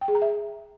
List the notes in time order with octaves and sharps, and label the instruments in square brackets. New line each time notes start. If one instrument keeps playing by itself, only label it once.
[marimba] G5
G#4
A#5
E5